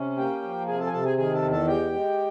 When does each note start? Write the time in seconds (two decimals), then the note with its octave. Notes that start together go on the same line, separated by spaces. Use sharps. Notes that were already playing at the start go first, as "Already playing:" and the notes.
Already playing: C3 C#4
0.17 A#3 G4 G5
0.42 F3
0.67 C3 G#4 G#5
0.79 A4 A5
0.86 G#5
0.92 C3 A4 A5
1.05 G#4 G#5
1.17 D#3 G#4 G#5
1.34 A4 A5
1.43 E2
1.51 A4 A5
1.67 G#3 G4 G5
1.92 G#3